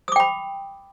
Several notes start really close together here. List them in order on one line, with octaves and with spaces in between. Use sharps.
D#6 D6 G5 B5